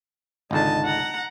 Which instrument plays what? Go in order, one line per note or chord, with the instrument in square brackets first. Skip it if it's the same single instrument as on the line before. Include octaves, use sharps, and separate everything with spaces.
[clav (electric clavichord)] G#1 C#2 D3 [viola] D#4 A5
[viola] F#5 A#5